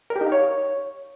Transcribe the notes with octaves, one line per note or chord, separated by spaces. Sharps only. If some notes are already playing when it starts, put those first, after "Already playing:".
A#4
G4
D#4
F5
C#5